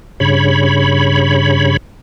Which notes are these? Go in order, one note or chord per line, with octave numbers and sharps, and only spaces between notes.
G2 C#3 C#5 B5